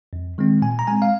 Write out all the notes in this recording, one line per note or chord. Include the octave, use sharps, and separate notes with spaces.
F2
D#3 G#3 C4
A#2 G#5
A#5
G#3 C4 G#5
F5